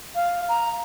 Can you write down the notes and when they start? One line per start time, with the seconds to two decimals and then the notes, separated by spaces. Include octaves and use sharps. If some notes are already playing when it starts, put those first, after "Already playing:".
0.15 F5
0.49 A#5